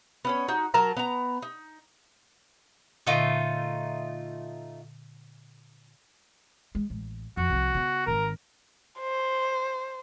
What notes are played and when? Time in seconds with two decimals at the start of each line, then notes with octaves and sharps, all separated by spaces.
0.25 B3 C#4 C#5
0.48 D#4 F#4
0.74 F#3 A#4 A5 A#5
0.97 B3 A#5
1.42 D#4
3.07 A#2 D3 A3 D#4 F4
6.75 G#3
6.90 A1
7.37 F2 F#4
7.50 C2 F3
7.74 C#3 B3
8.07 G#1 D#3 A#4
9.00 C5